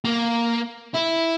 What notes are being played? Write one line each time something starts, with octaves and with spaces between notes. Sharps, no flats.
A#3
E4